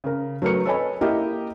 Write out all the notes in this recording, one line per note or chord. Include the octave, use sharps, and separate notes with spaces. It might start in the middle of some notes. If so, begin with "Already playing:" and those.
C#3 A#4
F#3 A3 A#4 B4 C#7
A4 B4 C#5 D#5 G#5 B5
A#3 E4 G4 A#4 D#5 E5